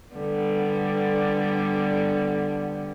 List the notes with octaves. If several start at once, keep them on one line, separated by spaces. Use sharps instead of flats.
D3 G3 B3